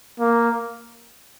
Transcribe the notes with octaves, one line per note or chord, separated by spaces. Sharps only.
A#3